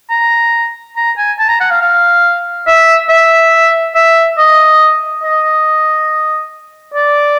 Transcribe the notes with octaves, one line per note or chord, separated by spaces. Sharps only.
A#5
A#5
G#5
A5
A#5
F#5
F5
F5
E5
E5
E5
D#5
D#5
D5